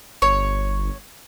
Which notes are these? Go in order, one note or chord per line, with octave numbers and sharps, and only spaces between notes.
G1 C#5